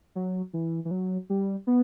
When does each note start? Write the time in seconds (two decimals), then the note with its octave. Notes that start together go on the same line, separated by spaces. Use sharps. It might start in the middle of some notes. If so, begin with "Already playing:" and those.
0.15 F#3
0.53 E3
0.85 E3
0.91 F#3
1.30 G3
1.67 B3